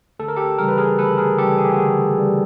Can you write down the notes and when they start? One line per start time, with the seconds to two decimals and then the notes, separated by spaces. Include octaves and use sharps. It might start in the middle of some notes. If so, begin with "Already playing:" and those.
0.19 D2 A4
0.28 A#4
0.36 G4 A4
0.58 C#3 E3 G3 A#4
0.68 B4
0.78 G#4 A#4
0.98 D2 A4 B4
1.17 G#4 A#4
1.37 C#3 E3 G3 G4 A4
1.58 G#4
1.65 G4
1.72 F#4 G#4
1.77 D2
2.17 C#3 E3 G3